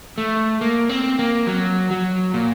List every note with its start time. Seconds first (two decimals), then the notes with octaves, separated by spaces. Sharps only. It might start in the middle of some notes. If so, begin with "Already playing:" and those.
0.18 A3
0.61 A#3
0.89 C4
1.19 A#3
1.48 F#3
1.91 F#3
2.34 A#2